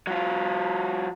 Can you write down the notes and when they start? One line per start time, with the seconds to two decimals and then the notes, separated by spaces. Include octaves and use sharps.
0.07 F#3 F4